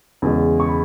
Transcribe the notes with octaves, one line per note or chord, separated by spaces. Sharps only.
E2 C#3 G#3
C#6
B5